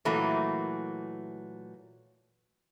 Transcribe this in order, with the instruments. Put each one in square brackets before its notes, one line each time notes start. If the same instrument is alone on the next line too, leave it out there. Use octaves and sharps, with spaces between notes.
[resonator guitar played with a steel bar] A#2 E3 F#3 A3 A#3